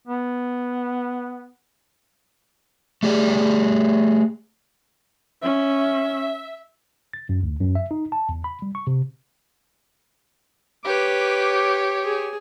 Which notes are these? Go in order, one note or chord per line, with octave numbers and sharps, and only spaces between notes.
B3
A3 G4 G#4 D5
C#4 E5
A6
F#2
D2
F#2
E5
D#4
A5
E2
B5
G3
C#6
C3
G4 B4 C#5 D6
G#4